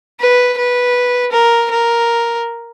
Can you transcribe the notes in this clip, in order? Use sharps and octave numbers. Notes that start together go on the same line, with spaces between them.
B4
B4
A#4
A#4